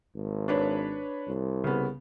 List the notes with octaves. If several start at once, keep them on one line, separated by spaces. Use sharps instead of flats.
G#1
D4 B4 C#5
C2
C#3 B3